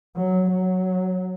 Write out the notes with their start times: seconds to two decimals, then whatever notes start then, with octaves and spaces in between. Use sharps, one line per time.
0.17 F#3
0.51 F#3